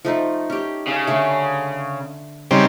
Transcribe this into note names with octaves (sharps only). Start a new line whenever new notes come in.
F3 A3 D#4
C#4 G4
C#3
D3 A3
C#3 G3 C4 D#4